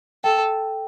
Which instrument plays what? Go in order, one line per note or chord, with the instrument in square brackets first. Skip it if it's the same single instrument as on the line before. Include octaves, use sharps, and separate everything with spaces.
[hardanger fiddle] A4 [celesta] G5